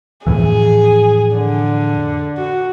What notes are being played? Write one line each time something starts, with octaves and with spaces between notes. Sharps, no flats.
F2 A2 E3 G#4
D3
F#4